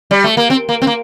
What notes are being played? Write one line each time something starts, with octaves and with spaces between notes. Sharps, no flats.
G3
A3
A#3
C4
A#3
C4
A#3